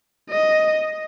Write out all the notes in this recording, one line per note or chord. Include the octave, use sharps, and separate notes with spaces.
D#5